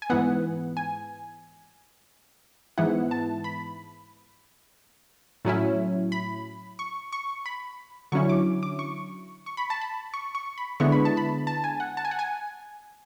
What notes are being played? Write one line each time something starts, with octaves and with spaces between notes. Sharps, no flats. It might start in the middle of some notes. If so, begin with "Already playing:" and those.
G#5
G#2 E3 B3 F#5
G#5
G#2 E3 B3 E4 F#5
A5
B5
A2 F#3 C#4 E4
B5
C#6
C#6
B5
D3 F#3 C#4 E4 C#6
D6
D6
C#6
C#6
B5
A5
B5
C#6
C#6
B5
D3 G#3 B3 E4 C#6
B5
A5
B5
A5
G#5
F#5
A5
G#5
F#5
G#5